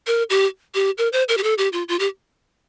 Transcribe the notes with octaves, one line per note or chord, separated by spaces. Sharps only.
A#4
G4
G4
A#4
C5
A#4
G4
A4
G4
F4
F4
G4